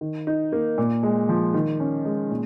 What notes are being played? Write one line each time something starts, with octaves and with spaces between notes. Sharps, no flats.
D#3
D#4
A#3
A#2
G#3
F3
D#3
C#4
G#3
A#2